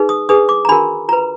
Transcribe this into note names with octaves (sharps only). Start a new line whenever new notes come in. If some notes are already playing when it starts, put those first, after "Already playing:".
Already playing: D#4 G#4 B4
D#6
D4 G#4 B4 D#6
D6
A#5
D4 F#4 A#4 B5
F4 B4 A#5